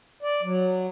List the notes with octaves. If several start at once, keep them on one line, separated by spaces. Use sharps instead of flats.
D5
F#3